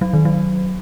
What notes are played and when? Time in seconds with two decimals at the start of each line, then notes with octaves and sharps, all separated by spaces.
0.01 F#3
0.13 D#3
0.25 F#3